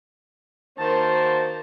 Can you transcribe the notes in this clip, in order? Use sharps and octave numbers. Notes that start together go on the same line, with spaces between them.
D#3 A#3 F#4 C5 A5